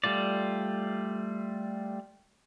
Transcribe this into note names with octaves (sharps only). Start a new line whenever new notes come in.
G3 A3 F4 D5